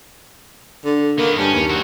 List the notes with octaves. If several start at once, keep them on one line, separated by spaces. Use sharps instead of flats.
D3
D#3 A#3 B3
G2 C#4
D#2
C4 F#4